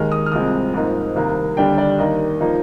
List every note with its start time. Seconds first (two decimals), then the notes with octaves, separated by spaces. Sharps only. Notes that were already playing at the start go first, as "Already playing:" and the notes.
Already playing: D#2 D#3 G#3 F6
0.12 D#6
0.26 F6
0.32 C2 A#2 G#3 C4 D#6
0.74 G#2 F3 A#3 D#4
1.16 C2 C3 D#3 A#3
1.57 D#2 D3 G3 D4 G5
1.78 D5
1.99 D#2 D#3 A#3 D#4 D#5
2.40 F3 A#3 D#4